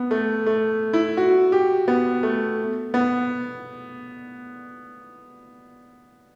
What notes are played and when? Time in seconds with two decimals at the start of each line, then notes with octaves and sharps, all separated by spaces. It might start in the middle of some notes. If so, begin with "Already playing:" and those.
Already playing: B3
0.11 A3
0.46 A3
0.93 E4
1.17 F#4
1.52 G4
1.88 B3
2.23 A3
2.94 B3